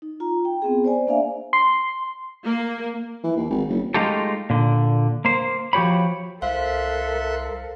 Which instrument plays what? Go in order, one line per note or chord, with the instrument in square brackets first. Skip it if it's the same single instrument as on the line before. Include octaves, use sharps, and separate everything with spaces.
[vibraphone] D#4
F4 A#5
G5
B3 C4 G#4
C5 D5 G#5
A#3 D4 D5 E5 F5 G#5
[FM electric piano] C6
[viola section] A#3
[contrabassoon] E3
D#2
G#1
F#1
[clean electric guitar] G#3 A3 D#4 F4 G4 A4
A#2 D3
A#3 C5
F3 F#4 G4 C#5 B5
[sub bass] C2 [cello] A4 A#4 [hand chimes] C5 F5 [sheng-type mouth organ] E5 C6 F#6